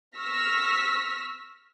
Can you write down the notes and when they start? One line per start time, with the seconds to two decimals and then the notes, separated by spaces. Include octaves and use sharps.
0.17 C#6 E6 F6 A#6 B6